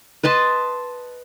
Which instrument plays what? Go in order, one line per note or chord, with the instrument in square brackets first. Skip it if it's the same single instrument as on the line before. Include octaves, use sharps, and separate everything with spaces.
[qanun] B4 D#5 A5 C6